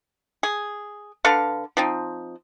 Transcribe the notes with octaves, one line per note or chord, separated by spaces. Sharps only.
G#4
D3 A4 B4 F5
F3 C4 D#4